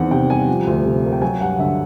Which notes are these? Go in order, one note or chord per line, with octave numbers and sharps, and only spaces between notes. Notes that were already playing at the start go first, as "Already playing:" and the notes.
Already playing: E2 D#3 C4 F#5
C3 G5
G3 G#5
F3
D2
C3
A#3
G5
F#3 G#5
G2 F#5
D3 E5